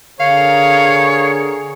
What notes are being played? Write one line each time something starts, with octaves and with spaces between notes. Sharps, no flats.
D3 G#4 A#4 C#5 F5